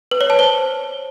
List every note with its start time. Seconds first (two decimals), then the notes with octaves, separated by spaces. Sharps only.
0.11 B4
0.21 C#5
0.30 A5
0.39 C5